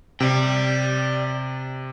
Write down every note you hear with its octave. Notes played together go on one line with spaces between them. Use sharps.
C3 D5 G5